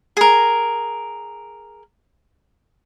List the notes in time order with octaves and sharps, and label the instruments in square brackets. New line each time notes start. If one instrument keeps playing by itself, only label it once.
[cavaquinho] G#4 A#4